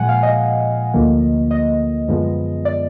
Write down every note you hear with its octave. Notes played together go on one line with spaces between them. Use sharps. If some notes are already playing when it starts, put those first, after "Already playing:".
Already playing: A#2 F3 G#3 F#5 G#5
F5
D#5
D2 D3 F3 A#3
D#5
F#2 D3 F3 G#3 B3
D5